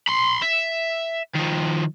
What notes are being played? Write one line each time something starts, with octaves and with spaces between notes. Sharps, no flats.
B5 C6
E5
D#3 F3